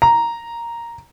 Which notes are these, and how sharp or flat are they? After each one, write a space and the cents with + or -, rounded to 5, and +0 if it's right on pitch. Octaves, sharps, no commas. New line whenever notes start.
A#5 +0